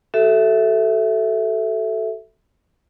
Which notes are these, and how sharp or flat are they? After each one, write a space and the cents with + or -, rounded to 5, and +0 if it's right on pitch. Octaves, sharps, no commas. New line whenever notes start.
F#4 +40 A4 +0 E5 +0